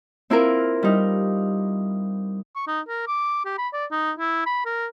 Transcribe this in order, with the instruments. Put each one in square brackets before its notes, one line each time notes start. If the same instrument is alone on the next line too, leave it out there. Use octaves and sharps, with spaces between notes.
[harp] C4 E4 F4 A#4
G3 D#4
[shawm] C#6
D#4
A#4
D6
G4
B5
D5
D#4
E4
B5
A#4